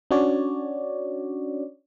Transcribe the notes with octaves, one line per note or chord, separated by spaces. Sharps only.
C#4 D4 F#4 C#5 D5